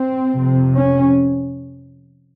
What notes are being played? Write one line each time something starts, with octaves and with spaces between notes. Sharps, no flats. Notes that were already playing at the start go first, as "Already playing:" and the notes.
Already playing: C4
F2 C3
C#4